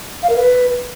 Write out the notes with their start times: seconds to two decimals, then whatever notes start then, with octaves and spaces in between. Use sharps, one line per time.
0.23 F5
0.29 A#4
0.36 B4